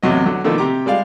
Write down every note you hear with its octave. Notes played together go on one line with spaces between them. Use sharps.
A1 E2 C3 F#3 D#5
D3 F#3
B2 D3 D#3 F3 A3 A#3
C3 G4 A#5 D6
G3 G#3 D5 F5